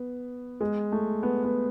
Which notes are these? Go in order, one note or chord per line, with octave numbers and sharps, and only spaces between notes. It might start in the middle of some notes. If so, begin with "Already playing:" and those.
Already playing: B3
G#3
A3
B3
B3